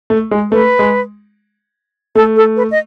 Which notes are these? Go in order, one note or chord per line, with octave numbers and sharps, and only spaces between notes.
A3
G#3
A3 B4
G#3
A3 A4
A4
B4
D#5